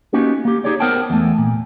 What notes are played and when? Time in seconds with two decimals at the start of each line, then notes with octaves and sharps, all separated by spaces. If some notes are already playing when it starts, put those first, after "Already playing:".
0.13 A#3 B3 C#4 D#4 F#4 G4
0.45 A#3 G4
0.64 D#4 G4 G#4 C#5 D5
0.80 B3 A#4 C5 F#5 G5 A5
1.10 E2 A3
1.38 A#2